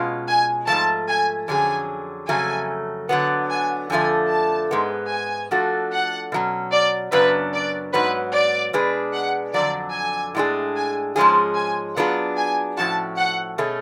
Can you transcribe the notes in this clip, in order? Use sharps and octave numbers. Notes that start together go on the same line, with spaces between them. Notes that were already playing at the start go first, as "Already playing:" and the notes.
Already playing: B2 G#3 C#4 F4
G#5
G#2 F3 A3 A5
G#5
F2 D3 F#3 C#4 G#4 G#5
F2 C#3 F#3 A3 G#5
D3 F#3 B3 F#5
G#5
F2 D3 F3 A3 G#5
A5
G#2 G#3 B3
G#5
F3 A3 D4 F#4 A4
F#5
B2 F#3 C#4
D5
F#2 C#3 F#3 B3 D4 B4
D5
G#2 F#3 B3 B4
D5
B2 G#3 D4 G#4 B4
F#5
F2 D3 F#3 D5
G#5
A2 G#3 D4 G#4
G#5
G#2 F3 G#3 C#4 G#4 A5
G#5
F#3 B3 D4 F4 G#4 F#5
G#5
A2 F3 G#3 C#4 F#4 A5
F#5
B2 A3 C#4 G#4